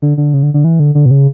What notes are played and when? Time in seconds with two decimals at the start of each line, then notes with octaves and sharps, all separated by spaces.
0.02 D3
0.18 D3
0.34 C#3
0.43 D3
0.54 D3
0.64 E3
0.80 D3
0.95 D3
1.06 B2
1.11 C#3